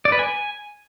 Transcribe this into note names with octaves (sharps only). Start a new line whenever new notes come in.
D5
B4
G#5